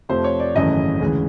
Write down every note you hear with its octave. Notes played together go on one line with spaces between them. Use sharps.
F2 C3 F3 A3 C5
C#5
D5
G#1 F#2 C#3 E3 A3 D#5
D2 C#3 E3 G#3